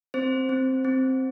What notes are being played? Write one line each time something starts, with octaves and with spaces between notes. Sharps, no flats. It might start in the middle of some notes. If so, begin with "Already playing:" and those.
C4 C5
C4
C4